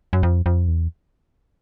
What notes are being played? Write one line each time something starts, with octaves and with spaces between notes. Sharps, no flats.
F#2
F2
F2
E2